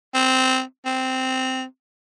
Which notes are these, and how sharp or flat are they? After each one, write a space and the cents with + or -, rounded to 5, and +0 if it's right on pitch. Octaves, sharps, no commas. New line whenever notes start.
C4 -10
C4 -10